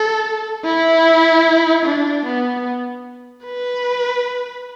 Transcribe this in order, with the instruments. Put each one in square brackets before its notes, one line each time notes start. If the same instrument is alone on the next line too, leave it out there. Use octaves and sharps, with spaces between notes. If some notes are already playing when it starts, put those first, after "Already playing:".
Already playing: [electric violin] A4
E4
D4
B3
B4